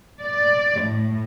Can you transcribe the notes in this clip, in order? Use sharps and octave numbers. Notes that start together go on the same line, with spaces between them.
D5
A2